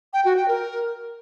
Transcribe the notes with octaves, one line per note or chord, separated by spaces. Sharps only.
G5
F#4
G5
A#4